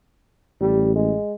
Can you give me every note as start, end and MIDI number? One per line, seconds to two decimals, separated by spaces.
0.61 1.13 33
0.61 0.91 55
0.95 1.34 56